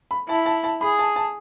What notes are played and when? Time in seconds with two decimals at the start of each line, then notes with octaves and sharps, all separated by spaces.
0.11 B5
0.29 E4 A5
0.46 A5
0.64 A5
0.81 G#4 B5
0.99 A5
1.16 A5